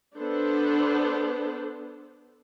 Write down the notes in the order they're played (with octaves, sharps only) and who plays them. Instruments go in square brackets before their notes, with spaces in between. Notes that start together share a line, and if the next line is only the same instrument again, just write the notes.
[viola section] B3 D4 A4 C5